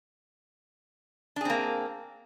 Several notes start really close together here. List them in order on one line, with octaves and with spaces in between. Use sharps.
D4 G#4 C4 A#3